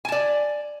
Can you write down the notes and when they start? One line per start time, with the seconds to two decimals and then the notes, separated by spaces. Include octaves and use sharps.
0.05 G#5
0.08 A5
0.12 D5